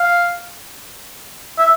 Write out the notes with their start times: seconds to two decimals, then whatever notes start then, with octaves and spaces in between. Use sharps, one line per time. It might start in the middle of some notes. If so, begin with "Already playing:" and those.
Already playing: F5
1.58 E5